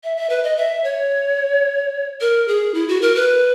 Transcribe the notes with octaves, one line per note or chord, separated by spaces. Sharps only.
E5
E5
B4
D#5
E5
C#5
A#4
G#4
E4
F#4
A#4
B4